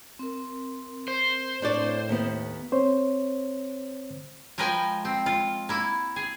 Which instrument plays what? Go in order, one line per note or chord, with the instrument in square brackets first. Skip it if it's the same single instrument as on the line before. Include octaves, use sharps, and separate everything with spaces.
[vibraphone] C4 A#4
[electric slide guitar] C5
[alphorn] A2 [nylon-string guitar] D4 C#5 D5
[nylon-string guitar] D#2 B3
[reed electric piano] C4 C5 C#5
[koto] F3 G#3 A#4 B4 G5 G#5
C4
F4
A#3 E4
G#4